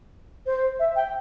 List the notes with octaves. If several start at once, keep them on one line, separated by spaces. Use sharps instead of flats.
C5
E5
G5